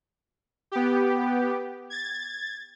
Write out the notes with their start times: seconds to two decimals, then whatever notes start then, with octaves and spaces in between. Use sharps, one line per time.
0.72 B3 G4
1.90 G#6 A6